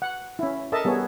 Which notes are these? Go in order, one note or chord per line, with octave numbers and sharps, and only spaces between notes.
F#5
C#4 E4
A4 A#4 D#5 E5 A5
G3 B3 G#4 C#5